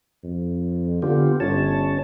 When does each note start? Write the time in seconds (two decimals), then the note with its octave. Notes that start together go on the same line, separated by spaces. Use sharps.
0.24 F2
1.02 D3 B3 F4 G4
1.40 G1 C#4 C#5 A5